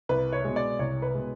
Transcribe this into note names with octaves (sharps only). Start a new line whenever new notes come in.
C2 B4
C#5
B2 G#3
D5
C2 C#5
B4
B2 G#3